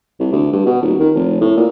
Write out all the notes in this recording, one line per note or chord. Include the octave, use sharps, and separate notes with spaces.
C2
D2
G2
B2
D#1
D#3
F1
A2
A#2